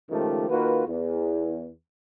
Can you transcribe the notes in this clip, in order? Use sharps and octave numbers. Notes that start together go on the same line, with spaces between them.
C#2 D#3 F3 G#3 A3 G4
D#3 A#3 F4 F#4 B4
E2